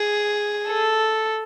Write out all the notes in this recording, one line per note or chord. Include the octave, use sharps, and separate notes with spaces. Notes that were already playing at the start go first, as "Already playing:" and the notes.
Already playing: G#4
A4